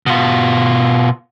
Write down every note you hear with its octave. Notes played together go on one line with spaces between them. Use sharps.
B2 F4